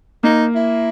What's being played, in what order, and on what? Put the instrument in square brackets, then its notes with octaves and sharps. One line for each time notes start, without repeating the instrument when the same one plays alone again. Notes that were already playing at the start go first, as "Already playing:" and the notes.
[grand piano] A#3 [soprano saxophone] D#4
[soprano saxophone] E4